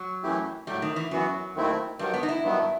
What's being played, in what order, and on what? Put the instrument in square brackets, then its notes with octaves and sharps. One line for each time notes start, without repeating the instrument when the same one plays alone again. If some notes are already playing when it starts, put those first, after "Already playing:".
Already playing: [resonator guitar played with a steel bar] F#3
[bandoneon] F#2 E3 A3 E4 G4
[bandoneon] A2 F#3 A3 [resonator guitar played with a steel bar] G3
[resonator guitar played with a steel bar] D#3
E3
[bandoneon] F#2 E3 B3 F#4 [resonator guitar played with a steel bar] F#3
[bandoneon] D#2 D#3 A3 C4 E4
[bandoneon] G2 D#3 F#3 [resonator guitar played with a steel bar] G3
[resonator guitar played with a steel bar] B3
D#4
E4
[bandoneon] G2 D#3 F#3 B3